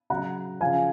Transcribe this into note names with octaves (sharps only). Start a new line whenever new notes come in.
C#3 F#3 F#5 A#5
C#3 F3 F5 G#5